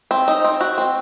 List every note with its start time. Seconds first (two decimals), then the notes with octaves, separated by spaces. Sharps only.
0.11 C4
0.28 D#4
0.44 C4
0.61 F#4
0.78 C4